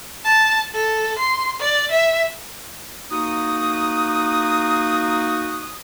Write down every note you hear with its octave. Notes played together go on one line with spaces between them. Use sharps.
A5
A4
C6
D5
E5
A#3 D#4 F#4 D#6